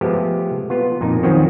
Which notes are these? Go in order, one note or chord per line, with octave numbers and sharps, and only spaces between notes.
F3 G#3 A3 B3 G4
B3 F4
F2 A#2 D#4
D#3 F3 F#3 C4 C#4 F#4